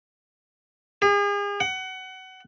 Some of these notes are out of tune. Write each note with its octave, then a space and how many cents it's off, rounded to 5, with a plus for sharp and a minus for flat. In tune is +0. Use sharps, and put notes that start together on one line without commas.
G#4 -40
F#5 +25